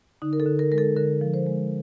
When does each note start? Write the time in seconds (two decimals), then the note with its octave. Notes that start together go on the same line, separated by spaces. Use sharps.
0.22 D3 D#4
0.33 A#4
0.40 A4
0.46 D3
0.59 A#4
0.72 G#3 A#4
0.78 A4
0.96 D3 A#4
1.21 F3
1.34 C5
1.46 G#3